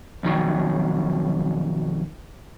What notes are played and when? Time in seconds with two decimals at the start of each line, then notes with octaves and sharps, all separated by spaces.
0.23 B1 F2 D#3 F#3